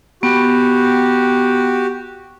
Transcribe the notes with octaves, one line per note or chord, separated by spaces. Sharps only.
B3 F#4 G4